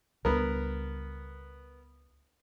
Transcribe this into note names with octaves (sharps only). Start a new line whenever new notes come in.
C#2 G3 B3 D4 A#4